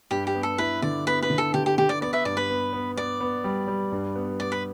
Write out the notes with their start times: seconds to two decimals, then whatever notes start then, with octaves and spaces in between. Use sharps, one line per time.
0.11 G2 G4
0.27 G4
0.35 B3
0.43 A4
0.58 E4 B4
0.82 D3 D5
1.07 B3 B4
1.23 B4
1.30 D3
1.38 A4
1.54 D3 G4
1.66 G4
1.78 D3 G4
1.89 D5
2.01 B3 D5
2.13 B4 E5
2.25 G2 D5
2.37 B4
2.50 B3
2.73 B3
2.97 B3 D5
3.21 B3
3.44 G3
3.68 G3
3.92 G2
4.16 B3
4.40 B3 D5
4.52 B4